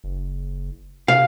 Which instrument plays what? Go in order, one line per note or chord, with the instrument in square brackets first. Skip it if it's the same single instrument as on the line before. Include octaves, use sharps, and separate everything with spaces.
[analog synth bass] F#1
[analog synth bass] C3 [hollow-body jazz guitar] F5